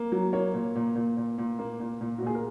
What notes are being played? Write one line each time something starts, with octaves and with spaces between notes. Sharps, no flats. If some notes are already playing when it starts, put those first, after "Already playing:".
Already playing: A#3
F#3
A#3 C#5
A#2
A#2
A#2
A#2
A#2
A#3
A#2
A#2
F#4
A#2 G#4
A#4